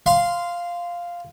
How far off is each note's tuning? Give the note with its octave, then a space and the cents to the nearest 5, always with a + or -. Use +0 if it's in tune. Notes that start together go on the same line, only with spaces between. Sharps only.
F5 +0 C6 -15